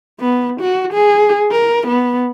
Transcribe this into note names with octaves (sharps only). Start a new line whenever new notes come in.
B3
F#4
G#4
A#4
B3